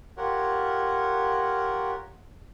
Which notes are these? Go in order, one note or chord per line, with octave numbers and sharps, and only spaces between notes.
F4 G4 A#4 C#5 F#5